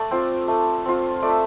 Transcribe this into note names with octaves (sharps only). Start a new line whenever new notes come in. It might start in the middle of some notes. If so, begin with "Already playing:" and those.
Already playing: A3 D5
C4 F4
A3
C4 F4
A3 D5
E5